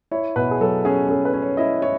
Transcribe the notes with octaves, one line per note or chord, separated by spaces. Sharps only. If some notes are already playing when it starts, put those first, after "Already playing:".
E4 C#5
B2 B4
G#4
F#3 A4
C#4 G#4
C#4 A4
B4
C#4
C#5
E4 D#5
E4 C#5